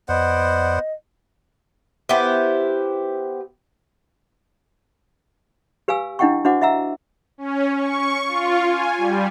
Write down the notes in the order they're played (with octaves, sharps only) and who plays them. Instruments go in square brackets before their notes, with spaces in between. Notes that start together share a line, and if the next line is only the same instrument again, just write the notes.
[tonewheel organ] F2 D5 [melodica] B3 C5 F#5 [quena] D#5
[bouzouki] B3 E4 G4 C5
[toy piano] G4 B4 F5 G#5 E6
D4 E4 D#5 F#5 G5 C#6
D4 F#4 C5 D#5 F#5 D6
D#5 E5 F#5 A#5 E6
[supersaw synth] C#4
C#6
F4
G#5
G3